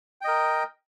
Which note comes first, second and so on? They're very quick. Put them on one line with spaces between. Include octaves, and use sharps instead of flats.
G5 D#5 A#4